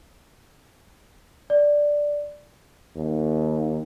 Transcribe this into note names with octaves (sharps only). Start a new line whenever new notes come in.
D5
D#2